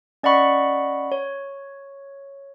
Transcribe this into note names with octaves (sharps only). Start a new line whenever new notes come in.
C#4 D5 D#5 F#5 B5 C#6
C#5